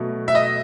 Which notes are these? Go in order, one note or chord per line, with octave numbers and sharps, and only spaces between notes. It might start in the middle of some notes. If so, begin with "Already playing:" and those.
Already playing: B2 F#3 A3
E5
D#5